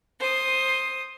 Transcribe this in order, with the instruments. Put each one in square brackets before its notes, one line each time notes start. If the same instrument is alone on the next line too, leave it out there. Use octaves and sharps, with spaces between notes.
[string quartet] C5 D#6